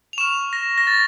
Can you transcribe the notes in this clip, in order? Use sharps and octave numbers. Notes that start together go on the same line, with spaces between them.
F7
C#6 F6 E7
A#6
A#6
A6